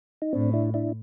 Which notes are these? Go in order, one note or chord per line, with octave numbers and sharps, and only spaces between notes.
D#4
A2 C4 D4
D4 E4
D4 E4